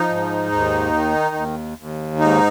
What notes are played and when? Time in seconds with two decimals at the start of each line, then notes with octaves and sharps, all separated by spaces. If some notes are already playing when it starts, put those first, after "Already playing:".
Already playing: F3 D#4
0.09 G#2
0.52 D#2
0.94 D#3
1.35 D#2
1.78 D#2
2.19 G#2 D#4